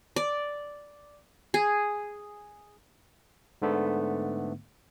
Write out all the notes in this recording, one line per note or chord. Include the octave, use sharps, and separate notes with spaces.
D5
G#4
G#2 D3 A3 B3